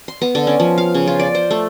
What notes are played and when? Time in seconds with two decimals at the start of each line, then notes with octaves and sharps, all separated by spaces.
0.08 C6
0.22 B3
0.35 D3
0.47 C#4
0.60 F3
0.78 F5
0.95 C#3
1.07 F4
1.19 D5
1.35 C5
1.51 A3